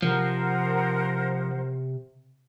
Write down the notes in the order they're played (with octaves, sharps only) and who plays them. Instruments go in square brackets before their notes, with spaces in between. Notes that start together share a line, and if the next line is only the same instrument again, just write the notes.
[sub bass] C3 [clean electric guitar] F3 [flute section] A#4 C5 F#5